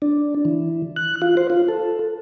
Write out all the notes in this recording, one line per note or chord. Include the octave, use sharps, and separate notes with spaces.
D4
E3
F#6
F4
C5
F4
A4